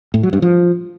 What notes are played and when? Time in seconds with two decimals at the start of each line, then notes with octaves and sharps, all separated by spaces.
0.14 A2
0.23 F#3
0.33 G2
0.42 F3